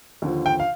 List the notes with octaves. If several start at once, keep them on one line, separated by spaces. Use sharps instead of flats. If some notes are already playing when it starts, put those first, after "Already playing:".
D#2 D3 F3
G5
F5